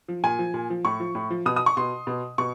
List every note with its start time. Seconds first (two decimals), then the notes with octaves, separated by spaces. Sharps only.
0.08 F3
0.24 A#2 G#5
0.39 F3
0.54 A#2
0.70 F3
0.85 A2 C#6
1.00 F3
1.15 A2
1.30 F3
1.46 B2 D#6
1.56 D#6
1.66 C#6
1.77 B2 C6
2.07 B2
2.38 B2 C#6